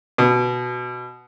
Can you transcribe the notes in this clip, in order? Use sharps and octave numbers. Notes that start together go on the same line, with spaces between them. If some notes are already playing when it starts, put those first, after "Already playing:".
B2